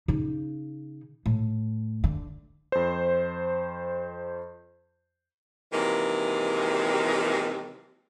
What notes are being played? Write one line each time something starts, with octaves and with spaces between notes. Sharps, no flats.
C#3 D#4
A2
D3
F2 C5
C3 D#3 E3 F#3 G#3 A#3